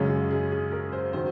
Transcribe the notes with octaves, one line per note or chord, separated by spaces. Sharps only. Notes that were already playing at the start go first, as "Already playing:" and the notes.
Already playing: F#2 C#3 G#3 C#4
G#4
G#4
G#4
A#4
C5
D#3 F#3 C5